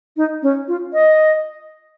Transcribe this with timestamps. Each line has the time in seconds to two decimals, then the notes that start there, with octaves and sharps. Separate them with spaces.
0.17 D#4
0.42 C#4
0.68 F4
0.93 D#5